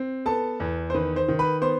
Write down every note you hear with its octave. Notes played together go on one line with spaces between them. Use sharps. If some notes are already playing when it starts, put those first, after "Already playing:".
Already playing: C4
B3 A4 A5
E2
C5
D#3 B4
C5
D#3
B4 B5
B3 C5 C6